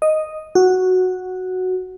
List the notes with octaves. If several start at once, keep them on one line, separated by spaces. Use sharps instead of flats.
D#5
F#4